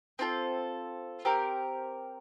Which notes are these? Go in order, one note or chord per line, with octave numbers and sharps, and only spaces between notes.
C4 F4 A4
C4 G4 A#4